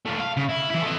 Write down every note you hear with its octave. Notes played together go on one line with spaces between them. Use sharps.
A3 F4
F5
C#3
E4
E3 E4
A4 D#5